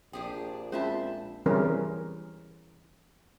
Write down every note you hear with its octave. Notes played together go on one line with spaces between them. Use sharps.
A#1 D4 G4 G#4 G5
G#3 C4 C#4 F4 C5 E5 A5 B5
E3 G3 C4 C#4 G#4 A#4